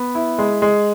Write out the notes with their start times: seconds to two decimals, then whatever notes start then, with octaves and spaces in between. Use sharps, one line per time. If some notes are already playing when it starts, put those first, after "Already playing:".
Already playing: B3
0.15 E4
0.39 G#3
0.62 G#3